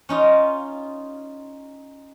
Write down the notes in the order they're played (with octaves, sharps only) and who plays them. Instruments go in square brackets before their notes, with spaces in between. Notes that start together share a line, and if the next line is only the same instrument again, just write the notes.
[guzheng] C#4 D#4 F4